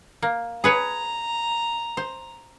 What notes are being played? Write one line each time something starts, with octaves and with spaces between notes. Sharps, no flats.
A#3
G#4 B4 C#5 A#5
C5